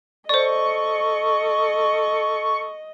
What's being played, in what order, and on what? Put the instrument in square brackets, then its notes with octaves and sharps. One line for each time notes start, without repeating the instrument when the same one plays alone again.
[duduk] A4 [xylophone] C5 D5 [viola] D#5 [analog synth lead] C#6